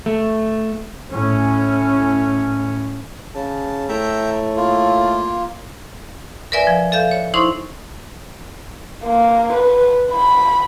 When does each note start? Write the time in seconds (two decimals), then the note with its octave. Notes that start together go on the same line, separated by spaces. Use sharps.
0.06 A3
1.11 A2 C#4
3.35 C#3 A5
3.89 A2 A3 E5 G5 A#5
4.56 A#3 F4
6.52 A#4 B4 D5 E5 G#5
6.67 F3
6.92 A4 E5 F5 G6
7.11 C#5
7.34 D#4 E4 C5 C6 C#6
9.05 A#3
9.53 B4
10.12 B5